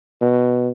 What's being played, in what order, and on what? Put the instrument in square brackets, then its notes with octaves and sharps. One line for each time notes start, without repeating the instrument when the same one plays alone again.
[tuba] B2